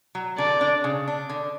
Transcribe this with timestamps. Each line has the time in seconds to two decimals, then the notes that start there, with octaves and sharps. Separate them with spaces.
0.15 F#3
0.38 D3 D5
0.61 D4
0.84 C#3
1.08 D4
1.30 D3